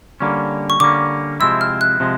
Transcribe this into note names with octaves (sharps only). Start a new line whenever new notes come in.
D3 G3 A#3 C#4
C#6
D3 G3 A#3 C#4 D6
C3 F3 G#3 C4 E4 E6
F6
F#6
C3 F3 G#3